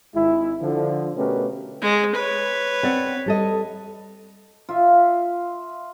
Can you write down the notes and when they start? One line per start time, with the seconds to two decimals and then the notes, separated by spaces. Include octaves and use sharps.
0.15 G#1 G#3 E4
0.60 D3 F3
1.17 B2 A3 C#4 G4 A#4 B4
1.82 G#3
2.15 B4 C#5
2.83 C4 D5 F#5
3.26 G3 A4 D#5
4.69 F4 E5